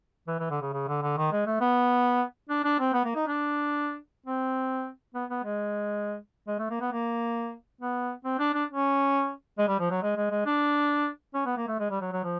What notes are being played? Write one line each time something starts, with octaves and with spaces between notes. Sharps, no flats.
E3
E3
D3
C#3
C#3
D3
D3
D#3
G#3
A3
B3
D4
D4
C4
B3
A#3
D#4
D4
C4
B3
B3
G#3
G#3
A3
A#3
B3
A#3
B3
C4
D4
D4
C#4
G#3
G3
F3
F#3
G#3
G#3
G#3
D4
C#4
B3
A#3
A3
G#3
G3
F#3
F#3
F3